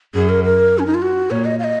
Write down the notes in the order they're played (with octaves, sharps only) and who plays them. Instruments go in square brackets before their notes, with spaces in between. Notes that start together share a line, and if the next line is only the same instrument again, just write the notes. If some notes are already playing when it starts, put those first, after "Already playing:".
[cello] F#2 [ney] G#4
[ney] A#4
A#4
C#4
D#4
F4
F#4
[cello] A#2 [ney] C#5
[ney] D#5
F5
D#5